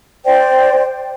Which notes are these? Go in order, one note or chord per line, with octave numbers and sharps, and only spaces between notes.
C5 D5 G5